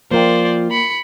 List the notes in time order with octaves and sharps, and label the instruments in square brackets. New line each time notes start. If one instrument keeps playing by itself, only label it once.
[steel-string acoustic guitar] F3 F4 [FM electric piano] A#3 A#4 G5 [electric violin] C5 D5
[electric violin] B5 C#7